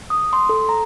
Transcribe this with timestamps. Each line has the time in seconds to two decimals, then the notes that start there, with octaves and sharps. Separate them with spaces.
0.10 D#6
0.33 C6
0.49 A4
0.69 A#5